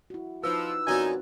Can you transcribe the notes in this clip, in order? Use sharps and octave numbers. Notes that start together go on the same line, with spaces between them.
E4 F#4
F3 D#4 F4 B4 E6
F#2 F#3 C4 D#4 B4 D5 G#5